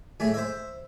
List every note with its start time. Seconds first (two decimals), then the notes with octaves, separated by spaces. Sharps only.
0.20 A2 A3 G#4
0.34 C5 E5